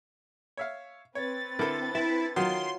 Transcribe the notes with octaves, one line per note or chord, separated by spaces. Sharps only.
C#5 E5 F5
C4 B4 C#5 A6
D3 E4 A4 A#4
E4 E5
D#3 F#3 F4 C6